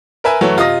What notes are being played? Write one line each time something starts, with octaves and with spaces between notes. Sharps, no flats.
A#4 B4 E5 G#5
E3 F#3 A3
C3 F4 D#5 D#6 A#6